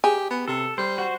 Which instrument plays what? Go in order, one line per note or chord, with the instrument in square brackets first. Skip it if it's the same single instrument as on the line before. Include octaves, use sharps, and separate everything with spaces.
[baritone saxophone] G4 [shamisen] G#4
[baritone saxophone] B3
[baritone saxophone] C3 [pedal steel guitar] A4
[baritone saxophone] G3 [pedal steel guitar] C5
[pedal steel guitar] F#4 C5